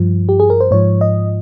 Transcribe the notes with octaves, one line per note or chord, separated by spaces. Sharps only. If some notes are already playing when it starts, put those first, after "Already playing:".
Already playing: G2 F3
G4
G#4
A#4
C5
G#2 F3 C#5
D#5